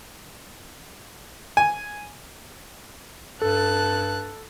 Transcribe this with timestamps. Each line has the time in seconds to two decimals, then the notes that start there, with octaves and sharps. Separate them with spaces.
1.57 G#5
3.42 G2 A4 A5 F#6